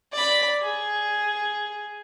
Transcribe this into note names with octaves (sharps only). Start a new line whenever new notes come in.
D5 B5
G#4